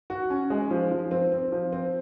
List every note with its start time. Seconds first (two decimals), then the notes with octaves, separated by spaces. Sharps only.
0.10 F#4
0.30 C#4
0.50 G#3
0.71 F3
0.91 F3
1.11 C4
1.32 C4
1.52 F3
1.72 C4